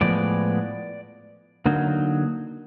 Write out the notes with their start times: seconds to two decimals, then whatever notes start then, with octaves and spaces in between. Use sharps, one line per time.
0.01 A2 F3 G#3 B3 D5
1.66 D3 F#3 A#3 D#4